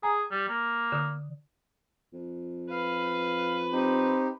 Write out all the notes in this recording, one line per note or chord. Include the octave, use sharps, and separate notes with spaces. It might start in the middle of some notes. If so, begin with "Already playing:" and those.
G#4 G5 G#5 A#5
G3
A#3
D3 D#6
F2
B4 F5
C4 D#4 G4